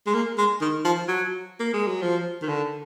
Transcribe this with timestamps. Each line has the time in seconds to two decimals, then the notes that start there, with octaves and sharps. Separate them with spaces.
0.06 G#3
0.14 A#3
0.38 G#3
0.61 D#3
0.85 F3
1.08 F#3
1.60 A#3
1.74 G#3
1.87 F#3
2.02 F3
2.42 D#3
2.48 D3